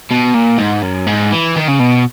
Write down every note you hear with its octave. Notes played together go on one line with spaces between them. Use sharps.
B2
A#2
G#2
F#2
G#2
E3
D#3
C#3
B2